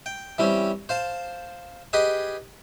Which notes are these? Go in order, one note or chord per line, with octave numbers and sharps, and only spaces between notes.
G5
E3 G3 C4 C#4
C5 F5 A5
G4 G#4 B4 D#5 G#5